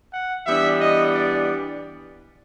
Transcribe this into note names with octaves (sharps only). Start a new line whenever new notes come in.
F#5
E3 G3 B3 D4 E5
D#5
D5